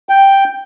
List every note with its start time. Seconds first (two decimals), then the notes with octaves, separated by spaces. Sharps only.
0.09 G5